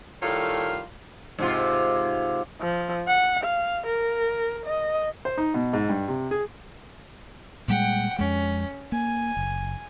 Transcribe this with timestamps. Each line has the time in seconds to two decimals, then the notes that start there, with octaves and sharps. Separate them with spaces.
0.22 A2 D#3 G3 F4 A4 C#5
1.38 G#2 C3 F4
2.61 F3
3.07 F#5
3.44 F5
3.87 A#4
4.66 D#5
5.25 C5
5.38 D#4
5.54 B2
5.73 G#2
5.89 G2
6.08 C3
6.31 G#4
7.68 A#2 G3 G#3 F#5 G5
8.19 F2 G#3 C#4
8.92 A#3 G#5
9.37 F#1